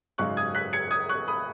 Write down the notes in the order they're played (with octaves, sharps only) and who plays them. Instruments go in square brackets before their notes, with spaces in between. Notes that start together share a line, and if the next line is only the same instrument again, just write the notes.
[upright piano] G#1 F#2 C#3 G#3 D#4 C#6 F#6
D#6 G#6
F#6 B6
G#6 C#7
D#6 G#6
C#6 F#6
B5 D#6